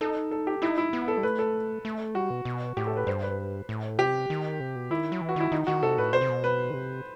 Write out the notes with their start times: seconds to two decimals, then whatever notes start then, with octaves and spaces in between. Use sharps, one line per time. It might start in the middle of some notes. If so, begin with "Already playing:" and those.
0.01 D#4 A4
0.31 A4
0.47 G4
0.62 D#4 E4
0.78 E4
0.93 B3
1.08 A4
1.17 G3
1.23 A3 B4
1.39 A4
1.85 A3
2.15 G3 F#4
2.30 B2
2.45 B2
2.77 A2 G4
2.87 A4
2.97 B4
3.07 G2 C5
3.23 B4
3.69 A2
3.99 C3 G4
4.30 D#3
4.60 C3
4.75 B2
4.90 D#3 E4
5.12 F#3
5.21 E3
5.29 F#4
5.36 D#3 E4
5.52 D#3 D#4
5.67 D#3 F#4
5.83 C3 A4
5.98 A2 B4
6.13 B2 C5
6.21 C3
6.29 B2
6.44 B4
6.70 D#3
6.74 C3